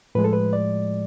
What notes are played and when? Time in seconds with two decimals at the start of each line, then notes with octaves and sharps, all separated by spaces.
0.15 A2 F3 G#3 B4
0.24 A4
0.33 B4
0.53 D5